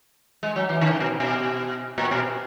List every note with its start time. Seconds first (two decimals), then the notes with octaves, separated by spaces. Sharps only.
0.43 G#3
0.56 F#3
0.69 E3
0.81 D#3
0.91 C#3
1.00 B2
1.20 B2
1.98 A#2
2.11 B2